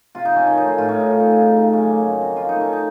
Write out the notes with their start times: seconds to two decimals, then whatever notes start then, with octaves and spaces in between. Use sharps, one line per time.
0.15 C3 F4
0.25 D#4
0.31 C4 C#4
0.46 D#3 C#4
0.57 D#4
0.63 A3 F4
0.78 A2 F4
0.89 C#4
0.94 A2
1.00 D#4
1.09 A3 F4
1.20 D#4
1.26 C4 F4
1.42 C#3 D#4
1.57 C#3
1.73 F#3 C#4
1.89 A#3
2.05 F#2
2.21 C4
2.36 D#3 F4
2.49 A3 D#4
2.61 C#4
2.73 D#4